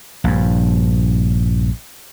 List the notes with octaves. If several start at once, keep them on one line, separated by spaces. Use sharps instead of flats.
A#1 G2